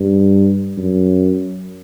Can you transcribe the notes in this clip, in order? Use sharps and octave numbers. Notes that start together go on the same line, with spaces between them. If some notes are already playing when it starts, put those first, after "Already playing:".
Already playing: G2
F#2